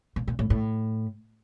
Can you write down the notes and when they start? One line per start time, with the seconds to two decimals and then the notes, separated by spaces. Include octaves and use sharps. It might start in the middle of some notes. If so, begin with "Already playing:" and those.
0.16 A#2
0.28 A#2
0.39 A2
0.50 A2